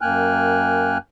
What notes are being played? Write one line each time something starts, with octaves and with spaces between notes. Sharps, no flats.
F#2 A#3 G5 G#5 F6 F#6